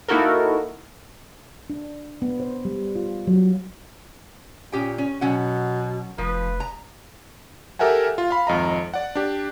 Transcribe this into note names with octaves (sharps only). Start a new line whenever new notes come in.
A#3 D#4 E4 F#4 A4 A#4
D4
B3
C5
G3
F4
F#3
A#2 C#4 G4 G5
C#4
B2 F#3 C#4 F#5
F1 F3 B4
A#5
G4 A4 A#4 E5 F#5 G#5
F4
F5 B5
G#1 F2 D#5 A#5
D5 F#5
D4 G4